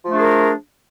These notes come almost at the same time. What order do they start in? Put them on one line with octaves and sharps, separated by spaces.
F3 A3 D4 G#4 A#4